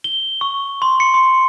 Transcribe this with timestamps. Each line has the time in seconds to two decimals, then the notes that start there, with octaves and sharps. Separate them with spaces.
0.04 G7
0.41 C#6
0.82 C6
1.00 C#7
1.14 C6